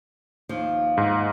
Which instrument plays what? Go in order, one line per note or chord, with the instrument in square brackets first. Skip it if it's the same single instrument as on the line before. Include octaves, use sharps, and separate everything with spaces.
[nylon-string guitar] D#2 F3
[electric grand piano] G#2